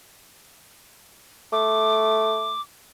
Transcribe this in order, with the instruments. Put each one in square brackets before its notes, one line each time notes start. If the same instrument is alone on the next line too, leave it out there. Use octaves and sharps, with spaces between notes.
[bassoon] A3 [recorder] D6